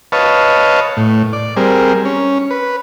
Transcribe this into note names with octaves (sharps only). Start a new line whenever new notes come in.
B4 C#5 D#5 F5 A5
A2
D5
G3 C4 G#4 A#4
C#4
B4